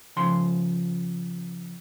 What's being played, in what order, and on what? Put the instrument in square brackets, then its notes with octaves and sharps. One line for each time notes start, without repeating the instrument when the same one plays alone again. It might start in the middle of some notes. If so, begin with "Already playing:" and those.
[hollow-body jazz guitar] C#3 F3 C6